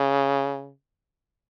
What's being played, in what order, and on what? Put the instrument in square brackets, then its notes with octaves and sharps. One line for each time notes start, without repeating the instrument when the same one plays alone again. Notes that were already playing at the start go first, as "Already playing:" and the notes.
Already playing: [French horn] C#3